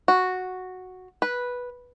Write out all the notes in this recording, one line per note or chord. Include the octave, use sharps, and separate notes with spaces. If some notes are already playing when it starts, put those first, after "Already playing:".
F#4
B4